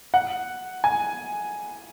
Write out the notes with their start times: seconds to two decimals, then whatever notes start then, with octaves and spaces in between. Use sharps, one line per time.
0.14 F#5
0.84 G#5